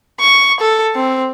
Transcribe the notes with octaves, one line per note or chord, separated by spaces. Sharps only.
C#6
A4
C4